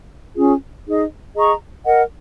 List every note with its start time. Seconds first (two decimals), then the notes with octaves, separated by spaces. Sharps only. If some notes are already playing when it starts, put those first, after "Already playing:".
0.35 C#4 F4 G#4
0.86 D#4 G#4 D#5
1.35 G#4 D#5 A#5 C#6
1.84 A#4 D#5 F#5